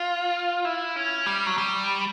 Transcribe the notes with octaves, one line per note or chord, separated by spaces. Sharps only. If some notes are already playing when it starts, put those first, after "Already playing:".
Already playing: F4
E4
C#4
G3
F#3
G3